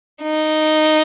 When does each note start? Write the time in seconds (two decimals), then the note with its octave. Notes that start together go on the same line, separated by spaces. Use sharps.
0.23 D#4